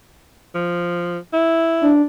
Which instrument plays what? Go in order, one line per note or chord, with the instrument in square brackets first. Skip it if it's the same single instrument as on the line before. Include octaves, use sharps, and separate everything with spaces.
[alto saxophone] F3
E4
[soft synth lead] D4